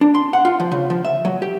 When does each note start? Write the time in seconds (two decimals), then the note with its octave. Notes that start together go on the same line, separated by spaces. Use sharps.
0.01 D4
0.15 C6
0.33 F#5
0.45 F4
0.60 F3
0.72 C#3
0.90 F3
1.05 E5
1.25 F#3
1.42 G4